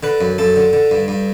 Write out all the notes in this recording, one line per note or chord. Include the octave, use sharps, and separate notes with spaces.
D3 B4
F#2
F#2 A4
D3
D3
G2
G2